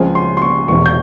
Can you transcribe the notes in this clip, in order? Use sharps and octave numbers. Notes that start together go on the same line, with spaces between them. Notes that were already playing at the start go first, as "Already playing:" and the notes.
Already playing: C#2 C#3 F3 C4 G#5
C6
C6
C#6
E1 E2 C3 C#6
G6